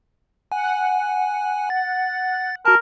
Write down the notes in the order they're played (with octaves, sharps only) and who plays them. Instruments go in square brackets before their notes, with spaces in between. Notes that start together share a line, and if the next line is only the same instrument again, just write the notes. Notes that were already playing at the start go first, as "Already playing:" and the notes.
[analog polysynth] F#5 [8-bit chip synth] G#5
[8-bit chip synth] A6
[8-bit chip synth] F#4 A5 [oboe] A#4